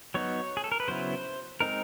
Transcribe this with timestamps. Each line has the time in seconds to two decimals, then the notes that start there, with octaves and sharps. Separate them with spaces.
0.14 F#3 B3 D#4 C#5
0.57 G#4
0.64 A4
0.72 A#4
0.80 B4
0.88 C#3 F#3 B3 E4 C5
1.60 G#3 C4 D#4 A#4